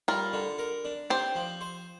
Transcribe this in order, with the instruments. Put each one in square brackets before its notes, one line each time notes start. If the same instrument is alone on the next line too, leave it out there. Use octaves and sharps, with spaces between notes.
[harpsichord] G3 [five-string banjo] F4 A#4
[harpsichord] D3
A#4
D4
[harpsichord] C4 [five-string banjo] G4 C5
[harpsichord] F3
C5